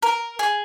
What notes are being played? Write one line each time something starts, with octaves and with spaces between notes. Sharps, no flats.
A#4
G#4